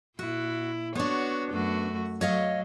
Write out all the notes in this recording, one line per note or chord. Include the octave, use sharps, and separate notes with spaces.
A#2 E4 F#4
B3 D4 F#4 C#5
F#2 A3 F#4
F#3 C#5 D#5 F5